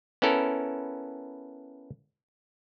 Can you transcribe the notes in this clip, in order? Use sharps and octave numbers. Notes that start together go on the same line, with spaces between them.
B3 C#4 E4 A4 A#4